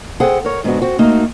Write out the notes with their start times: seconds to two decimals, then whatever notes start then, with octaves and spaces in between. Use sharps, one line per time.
0.20 G#4 A4 C5 F#5 G5
0.45 A#4 C#5
0.64 G#2 D3 B3 D4 F#4
0.82 C4 F#4
0.99 A3 A#3 D#4 F#4